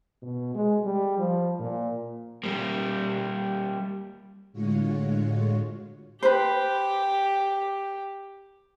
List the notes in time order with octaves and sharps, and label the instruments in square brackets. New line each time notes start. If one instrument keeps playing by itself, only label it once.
[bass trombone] B2
G#3
G3
F3
A#2
[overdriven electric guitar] G3 A#3
[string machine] A2 D3 G#3 F4 F#4 C#5
[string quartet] G4 [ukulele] B4 C5